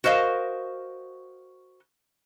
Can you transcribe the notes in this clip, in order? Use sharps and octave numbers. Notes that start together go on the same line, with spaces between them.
F#4 A#4 C5 D#5 F5